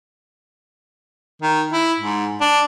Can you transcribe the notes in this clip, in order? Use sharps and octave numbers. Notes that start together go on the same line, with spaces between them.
D#3
E4
G#2
D4